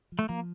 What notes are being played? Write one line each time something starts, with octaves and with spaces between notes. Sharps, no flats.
F3
A3
F3 A#3